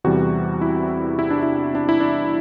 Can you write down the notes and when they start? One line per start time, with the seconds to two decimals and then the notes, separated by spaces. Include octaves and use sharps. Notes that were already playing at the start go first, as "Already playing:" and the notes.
0.04 E2 C3 E3 G3 F#4
0.62 E4
1.19 E4
1.30 D4
1.43 E4
1.75 D4
1.89 E4
2.00 D4